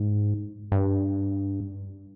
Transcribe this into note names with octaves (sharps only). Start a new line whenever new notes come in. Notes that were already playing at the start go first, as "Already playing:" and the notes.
Already playing: G#2
G2